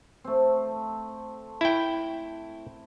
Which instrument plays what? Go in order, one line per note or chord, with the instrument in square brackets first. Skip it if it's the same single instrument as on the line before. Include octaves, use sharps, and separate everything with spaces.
[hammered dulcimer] A3 C4
[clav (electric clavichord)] E4 G5